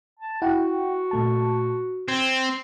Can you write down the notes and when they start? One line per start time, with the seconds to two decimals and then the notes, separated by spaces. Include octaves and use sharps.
0.19 A5
0.42 E4 F#4 F#5 G5
1.11 A#2 A3 A5
2.08 C4 G#6